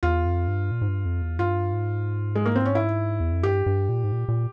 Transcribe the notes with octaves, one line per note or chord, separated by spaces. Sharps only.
E2 F4
F2
G2
A#2
G#2
G2
F2
E2
G2 F4
G#2
G#3
A#3
C4
C#4
E4
E2
F2
G2 G4
G2
A#2
G#2
A#2
A#2